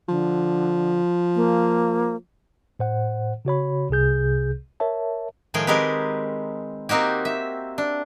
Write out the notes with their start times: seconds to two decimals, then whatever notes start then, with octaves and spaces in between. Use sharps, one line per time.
0.09 D3 F3
1.36 A#3
2.79 A2 C5 F#5
3.45 C#3 F#4 C#5 B5
3.90 C2 C3 G#4 G6
4.80 A#4 C#5 E5 A5
5.54 A2 D#3 F3 G#3 G#4 G5
5.67 G#3 C4 G4 G#4 A#4 B4
6.89 A#3 C4 D#4 F#4 G4
7.25 E5
7.78 D4